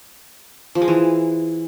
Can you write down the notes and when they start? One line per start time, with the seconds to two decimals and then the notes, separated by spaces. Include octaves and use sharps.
0.75 F3
0.82 G#3
0.88 E3